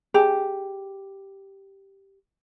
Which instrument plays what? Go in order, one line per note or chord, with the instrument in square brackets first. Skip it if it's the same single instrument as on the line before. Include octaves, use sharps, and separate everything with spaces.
[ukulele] G4 [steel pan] G#4